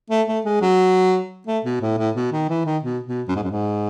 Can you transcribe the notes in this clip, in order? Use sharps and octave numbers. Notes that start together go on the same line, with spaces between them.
A3
A3
G#3
F#3
A3
B2
A2
A2
B2
D#3
E3
D#3
B2
B2
F#2
G#2
F#2
G#2